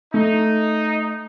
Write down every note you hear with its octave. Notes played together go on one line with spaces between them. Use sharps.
A3 D#4